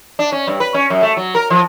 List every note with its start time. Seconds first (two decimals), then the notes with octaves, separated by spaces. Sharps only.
0.19 D4
0.32 C#4
0.47 G2
0.60 B4
0.74 C#4
0.90 F#2
1.03 A3
1.17 F#3
1.35 A#4
1.50 F3